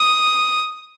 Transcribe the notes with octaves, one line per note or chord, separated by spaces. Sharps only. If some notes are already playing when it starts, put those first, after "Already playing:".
Already playing: D#6